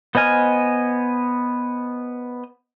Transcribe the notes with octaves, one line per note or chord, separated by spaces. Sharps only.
B3 C5 D#5 G#5 F6